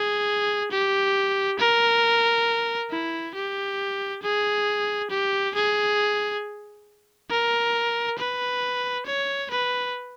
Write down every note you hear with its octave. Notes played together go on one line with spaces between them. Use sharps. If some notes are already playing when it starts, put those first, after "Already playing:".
Already playing: G#4
G4
A#4
E4
G4
G#4
G4
G#4
A#4
B4
C#5
B4